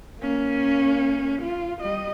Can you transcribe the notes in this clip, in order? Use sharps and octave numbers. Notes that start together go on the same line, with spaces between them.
A#3 C#4
F4
G3 D#5